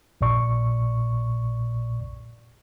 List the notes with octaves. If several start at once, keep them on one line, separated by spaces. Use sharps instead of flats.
A#1 A#2 D5 C#6